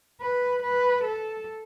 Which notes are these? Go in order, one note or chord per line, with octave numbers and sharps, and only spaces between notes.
B4
B4
A4